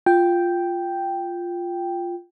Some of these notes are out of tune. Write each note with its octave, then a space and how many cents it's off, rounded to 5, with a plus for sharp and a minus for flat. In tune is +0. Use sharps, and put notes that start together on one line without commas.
F4 +0 G5 +0